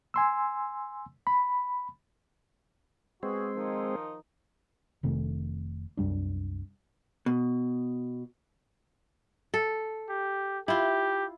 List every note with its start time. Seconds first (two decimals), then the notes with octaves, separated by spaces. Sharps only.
0.14 G#5 C6 E6
1.27 B5
3.23 G#3 B3 C4 F#4 G#4
3.56 D#3 F3 D#4
5.03 F1 C3 D#3 A3
5.97 C2 F#2 G3 D4
7.26 B2
9.54 A4
10.09 G4
10.68 E4 F4 G4